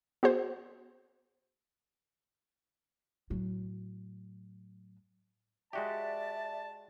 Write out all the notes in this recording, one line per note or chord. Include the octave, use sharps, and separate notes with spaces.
B3 F#4 G#4 C5
A2 F#3
G#3 F#4 G4 D5 E5 A5